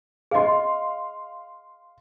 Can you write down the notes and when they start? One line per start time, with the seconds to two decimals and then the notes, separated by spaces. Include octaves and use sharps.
0.31 G#4 D#5 F5 C6